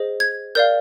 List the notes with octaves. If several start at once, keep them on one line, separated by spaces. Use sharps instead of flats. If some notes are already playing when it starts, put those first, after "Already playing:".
Already playing: G#4 C5 D#5
G#6
A#4 D5 F5 G6